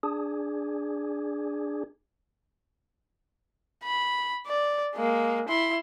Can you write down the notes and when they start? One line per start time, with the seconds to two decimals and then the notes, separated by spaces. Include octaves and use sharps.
0.03 D4 G#4
3.83 B5
4.46 D5
4.95 G#3 A#3
5.49 E4 C6